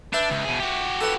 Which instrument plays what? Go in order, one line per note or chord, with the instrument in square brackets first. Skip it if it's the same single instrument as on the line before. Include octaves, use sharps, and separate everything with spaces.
[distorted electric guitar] D4 [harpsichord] B4 E5 G5
[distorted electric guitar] C#2
B2 G#4
F#4 G4
[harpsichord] A4 B4 F#5